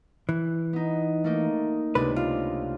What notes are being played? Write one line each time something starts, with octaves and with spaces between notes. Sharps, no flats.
E3
B3 D#4
A3 A#3 D#4
C#2 C3 D4 B4
F4